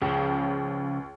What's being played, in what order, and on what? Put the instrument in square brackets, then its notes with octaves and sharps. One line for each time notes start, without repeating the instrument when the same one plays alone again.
[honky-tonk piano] C#2 [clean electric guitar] C#3 F3